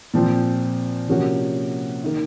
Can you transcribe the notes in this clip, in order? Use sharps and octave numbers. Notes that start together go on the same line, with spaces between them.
A#2 F3 C4 F4
C3 F3 A#3 C#4 F#4
D#3 A#3